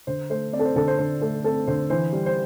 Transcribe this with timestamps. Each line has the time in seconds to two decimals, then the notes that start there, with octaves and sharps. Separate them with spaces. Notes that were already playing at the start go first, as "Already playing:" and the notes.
0.07 D3 C5
0.30 A3 C5
0.53 C4 D5
0.59 A4
0.65 C5
0.76 D3 A4
0.88 C5
0.98 D3 C5
1.21 A3 A4
1.44 C4 A4
1.67 D3 C5
1.90 E3 C5
2.13 G3
2.26 C5